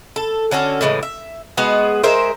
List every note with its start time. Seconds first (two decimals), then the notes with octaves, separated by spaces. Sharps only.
0.16 A4
0.51 D3 C#4 F#4 A4
0.81 A2 C#3 E3 G#3
1.03 E5
1.57 G#3 B3 F#4 G#4
2.03 G#3 A#4 C5 E5